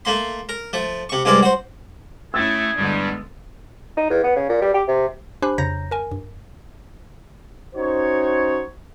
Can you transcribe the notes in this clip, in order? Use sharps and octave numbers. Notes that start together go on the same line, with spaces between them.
A3 A#3 C6
A#4
F3 A3
C3 C#6
G2 C3 G#3 A#4 D5
F#4 C5
A3 C#4 E4 G#4 E6 A6
G2 D3 G3 G#3 B3
D#4
E2
B3
C#3
A#2
G3
G4
C3
D4 G4 C5 G#5 B5 F#6
F2 C#3 C#5 A#5 G6 A#6
A#4 G#5
G2
C#4 D#4 F#4 C5 C#5